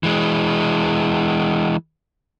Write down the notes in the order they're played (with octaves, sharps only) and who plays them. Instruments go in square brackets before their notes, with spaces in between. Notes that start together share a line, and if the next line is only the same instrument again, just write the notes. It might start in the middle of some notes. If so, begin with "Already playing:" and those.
[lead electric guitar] E3 G#3